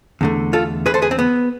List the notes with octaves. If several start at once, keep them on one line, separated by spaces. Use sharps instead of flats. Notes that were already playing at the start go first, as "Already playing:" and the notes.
E2 D3 A3
F4 A4
G#4 B4
A4 C5
G#4 B4
C4
B3